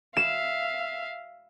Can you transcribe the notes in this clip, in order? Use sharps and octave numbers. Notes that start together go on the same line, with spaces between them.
E5 F5 E7